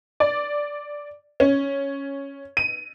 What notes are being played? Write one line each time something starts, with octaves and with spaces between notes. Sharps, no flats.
D5
C#4
D#7